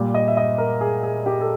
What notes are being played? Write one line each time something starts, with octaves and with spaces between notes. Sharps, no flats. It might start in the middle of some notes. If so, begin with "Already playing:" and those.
Already playing: A#2 G3
D#5
E5
D#5
A#4
G#4
G#4
G4
A4